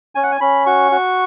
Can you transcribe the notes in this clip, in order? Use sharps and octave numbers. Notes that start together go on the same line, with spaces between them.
C#4 G#5
F#5
G#5
C#4 B5
F#4 C#6
F#4